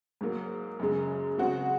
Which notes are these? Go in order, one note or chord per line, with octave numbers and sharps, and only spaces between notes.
G#2 F#3 A#3
F#2 C#3 G#3
C#3 G#3 C4 F#4